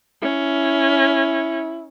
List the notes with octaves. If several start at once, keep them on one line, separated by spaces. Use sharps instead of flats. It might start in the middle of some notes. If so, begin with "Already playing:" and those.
C#4 E4